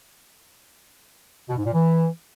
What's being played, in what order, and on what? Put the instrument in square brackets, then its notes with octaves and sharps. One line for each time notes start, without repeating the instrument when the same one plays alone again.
[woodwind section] B2
G#2
A#2
E3